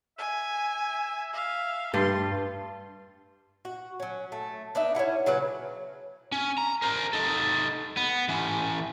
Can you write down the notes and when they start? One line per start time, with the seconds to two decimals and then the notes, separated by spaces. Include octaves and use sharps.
0.18 E5 G#5
1.34 E5 F5
1.93 G2 F4 C6
3.65 F#4
4.00 F#3 C#4
4.32 A3
4.75 B3 D4 D#4 E5
4.95 C#4 D4 E4 F#5
5.26 C#3 F#3 F#4 B4
6.32 C#4
6.58 A#5
6.82 A#4 C5
7.13 D#4 A4
7.97 B3
8.29 E3 C#4